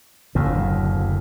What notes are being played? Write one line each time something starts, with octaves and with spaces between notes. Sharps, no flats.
F#1 D2 A2